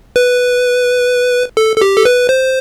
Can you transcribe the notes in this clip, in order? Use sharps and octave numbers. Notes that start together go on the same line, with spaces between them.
B4
A4
A4
G4
A4
B4
C5